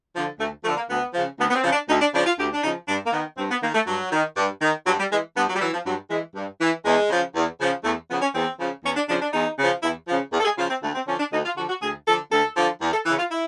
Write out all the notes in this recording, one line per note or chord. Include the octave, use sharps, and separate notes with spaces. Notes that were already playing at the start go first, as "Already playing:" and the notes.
D3 F3
D2 A3
D3 F3 A3
A#3
D2 B3
C#3 F3
D2 B3
B3
C4
C#3 F3
D4
D2 D#4
D4
C#3 F3 D4
F4
D2 G4
D4
C#3 F3 D#4
G2 D4
A#3
D#3 B3
G2 C4
B3
D#3 A#3
A3
G2 F#3
D#3
G2
D#3
G2 F#3
G3
E3 G#3
G2 B3
F#3
G3
E3 F#3
F3
G2 F#3
E3 G#3
G2
E3
E2 G#3
C#3 F3
E2
C#3 F3
E2 A3
C#3 F3 B3
C#4
E2 C4
C#3 F3
E2 C#4
D4
C#3 F3 D4
D4
E2 D#4
C#3 F3
E2 E4
C#3 F3
E2
A4
G#4
C#3 F3 F4
C4
D2 A3
C4
D3 F3 C#4
D4
D2 D#4
F4
D3 F3 F#4
F#4
D2 G#4
D3 F3 A4
D2 A4
D3 F3
E2
A4
C#3 E3
F4
E4